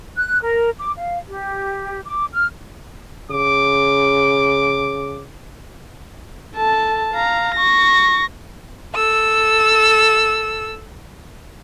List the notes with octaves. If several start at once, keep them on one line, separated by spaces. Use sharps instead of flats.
F#6
A#4
D6
F5
G4
D6
F6
C#3 D6
A4 A5
F5 A#5
C#6 A#6
A4 E6